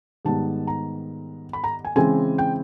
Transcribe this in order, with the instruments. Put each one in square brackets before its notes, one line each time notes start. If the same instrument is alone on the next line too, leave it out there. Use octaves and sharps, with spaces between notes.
[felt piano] G#2 D#3 G3 B3 A5
A#5
B5
A#5
G#5
C#3 E3 G#3 C4 G#5
G5